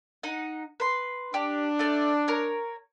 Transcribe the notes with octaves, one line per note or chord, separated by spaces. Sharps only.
D#4 F#5
B4 C6
D4 G4
A3 D5
A#4 C#5